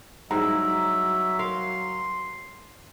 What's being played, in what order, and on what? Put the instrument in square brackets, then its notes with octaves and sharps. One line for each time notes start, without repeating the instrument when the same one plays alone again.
[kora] G#2 G3 E4 [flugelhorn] F#3 [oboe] E5 [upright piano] A#5
[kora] A#4 F5 [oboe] C6